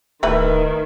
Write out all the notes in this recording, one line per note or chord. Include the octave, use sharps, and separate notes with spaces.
D1 D#3 A3 E4 B4